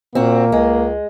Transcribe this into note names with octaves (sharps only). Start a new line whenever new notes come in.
A#2 A#3 C4 F#4
C#2 G#3